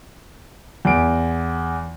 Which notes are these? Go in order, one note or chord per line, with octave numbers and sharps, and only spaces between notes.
E2 D7